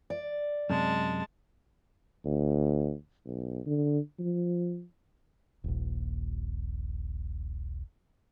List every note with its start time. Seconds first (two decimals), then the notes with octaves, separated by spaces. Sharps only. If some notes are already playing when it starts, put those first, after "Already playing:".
0.10 D5
0.70 F#2 C3 G#3 A5
2.25 D2
3.25 B1
3.66 D3
4.19 F3
5.64 D#1 A#1